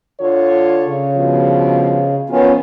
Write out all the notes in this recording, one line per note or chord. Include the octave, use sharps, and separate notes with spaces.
D3 F4 C#5
C#3
G2 B2 F3
D#3 F3 B3 C#4 F4